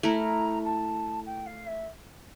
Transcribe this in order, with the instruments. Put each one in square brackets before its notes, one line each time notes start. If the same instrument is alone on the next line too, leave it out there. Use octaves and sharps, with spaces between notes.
[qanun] A3 E4 A#4 [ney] A#5
[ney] A5
G5
F5
E5